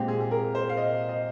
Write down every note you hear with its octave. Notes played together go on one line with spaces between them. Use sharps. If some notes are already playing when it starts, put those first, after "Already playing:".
Already playing: A#2 G#3 C4 G4
G#4
G#4
A#4
C5
F5
D#5
D#5